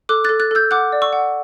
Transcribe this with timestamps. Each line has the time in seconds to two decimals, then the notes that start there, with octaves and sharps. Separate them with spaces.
0.09 A4 D6 F#6
0.24 A4 F#6 A6
0.40 F#6 A6
0.51 A4 E6 G6
0.71 F#5 D6 F#6
0.92 D5
1.02 C#6 E6
1.13 F#5